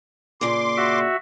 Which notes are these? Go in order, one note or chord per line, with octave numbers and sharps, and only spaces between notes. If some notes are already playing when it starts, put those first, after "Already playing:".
A#2 C#3 C6 D6
F#4 E5